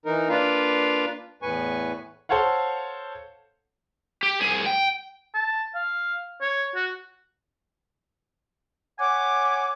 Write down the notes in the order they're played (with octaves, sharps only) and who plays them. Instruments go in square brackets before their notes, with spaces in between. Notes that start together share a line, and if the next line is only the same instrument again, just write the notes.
[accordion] E3 D#4 A#4
A#3 D4 F4 B4 F5
E2 A2 B4 G#5 C#6
[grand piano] A4 C5 C#5 F5 F#5
[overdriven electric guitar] G4
C2 G#4
G5
[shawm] A5
F5
C#5
F#4
[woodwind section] C#5 F#5 G#5 D6